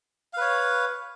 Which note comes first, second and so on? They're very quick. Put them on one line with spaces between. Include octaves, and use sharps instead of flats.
F5 B4 C#5